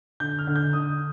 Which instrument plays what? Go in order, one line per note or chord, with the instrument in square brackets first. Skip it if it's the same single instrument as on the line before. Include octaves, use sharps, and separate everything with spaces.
[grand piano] D3 G6
F6
D3
G6
D3 D#6